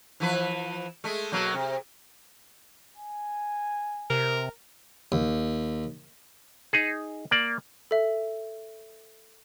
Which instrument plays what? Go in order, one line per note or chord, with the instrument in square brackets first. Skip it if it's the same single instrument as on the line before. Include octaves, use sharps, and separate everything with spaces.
[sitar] E3 F3 B4
G#3 A3
B2 F#3 A#3
C3
[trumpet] G#5
[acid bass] C3 [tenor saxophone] A#4
[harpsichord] D#2
[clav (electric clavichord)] D#4 G#4
A#3 D5
[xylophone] A4 E5